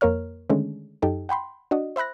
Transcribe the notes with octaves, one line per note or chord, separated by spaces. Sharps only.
F2 A#3 A#4 C#5 F6
D3 D#3 G#3 A3 C#4
F#2 D#4 G4 A4
F#5 G5 B5 C6
D4 F#4 D#5
C5 E5 B5 F#6 A#6